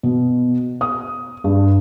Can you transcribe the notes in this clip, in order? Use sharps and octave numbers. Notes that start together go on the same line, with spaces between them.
B2
D#6
G2